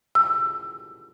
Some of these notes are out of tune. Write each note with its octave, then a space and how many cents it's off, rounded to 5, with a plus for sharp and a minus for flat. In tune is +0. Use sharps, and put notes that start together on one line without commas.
E6 +30